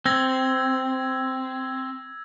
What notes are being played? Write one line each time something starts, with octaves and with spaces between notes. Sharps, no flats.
C4 E6 G#6 A#6